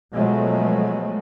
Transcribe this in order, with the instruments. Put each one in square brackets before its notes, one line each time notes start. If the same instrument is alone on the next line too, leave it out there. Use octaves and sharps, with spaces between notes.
[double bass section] B2 F3 F#3 G#3 A3